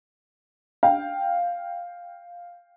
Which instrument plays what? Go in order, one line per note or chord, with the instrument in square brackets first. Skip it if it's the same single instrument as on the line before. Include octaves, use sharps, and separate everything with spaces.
[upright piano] F5 G5